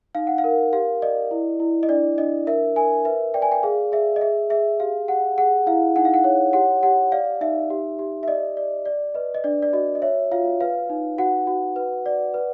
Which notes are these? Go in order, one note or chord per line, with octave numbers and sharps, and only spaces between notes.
D#4 F5
F#5
F5
A#4
G4 F5
D5 D#5
E4
E4
D#5
D4 D5
D4 D#5
A#4 E5
A#4 G#5
B4 E5
D5 G5
G#5
G5
G#4 F5
G#4 E5
D#5
G#4 E5
G#4 E5
G4 F5
G4 F#5
G#4 F#5
E4 F5
D#4 F#5
F5
F#5
C#5
G4 F#5
G4 F#5
D5 F5
D#4 E5
G4
G4
E5
D5 D#5
D5
D5
B4 D#5
D#5
D4 D5
D5
F#4 D#5
D#5
C#5 E5
F4 F5
B4 F5
D#4
F#4 F#5
F#4
B4
D5
B4